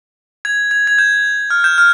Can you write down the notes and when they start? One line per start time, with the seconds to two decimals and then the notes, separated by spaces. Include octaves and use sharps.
0.45 G#6
0.71 G#6
0.87 G#6
0.98 G6
1.50 F6
1.64 G6
1.78 F6